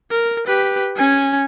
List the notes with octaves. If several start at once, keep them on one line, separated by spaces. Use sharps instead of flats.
A#4
G4 B4
C#4 G#5